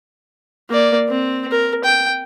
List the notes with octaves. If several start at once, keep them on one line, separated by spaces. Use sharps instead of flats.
A#3 D5
C4
A#4
G5